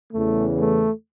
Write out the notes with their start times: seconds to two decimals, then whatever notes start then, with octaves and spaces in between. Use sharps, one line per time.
0.13 E2 C#3 E3 A3
0.59 A3